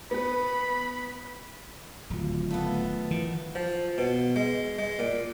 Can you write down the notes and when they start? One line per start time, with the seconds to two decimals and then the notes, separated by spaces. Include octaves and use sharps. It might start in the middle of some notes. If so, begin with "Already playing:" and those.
0.11 B3 B4 B5
2.10 D1 D#3 F#3 F4
2.51 A3 B3 F4 F5
3.11 D#3 E3
3.55 F3
3.98 B2
4.36 G#3
4.79 G#3
4.99 A#2